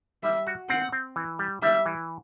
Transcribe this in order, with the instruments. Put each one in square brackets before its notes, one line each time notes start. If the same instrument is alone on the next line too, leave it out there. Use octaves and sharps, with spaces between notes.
[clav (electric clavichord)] G3 [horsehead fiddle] E5
[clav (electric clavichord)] F#4
[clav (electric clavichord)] C4 [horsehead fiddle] F#5
[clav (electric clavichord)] C4
E3
G3
[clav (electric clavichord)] G3 [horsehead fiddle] E5
[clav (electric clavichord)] E3